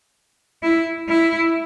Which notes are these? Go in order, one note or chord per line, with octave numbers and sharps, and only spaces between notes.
E4
E4